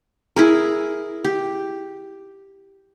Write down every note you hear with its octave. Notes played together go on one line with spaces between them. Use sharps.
E4 G#4 A#4
G4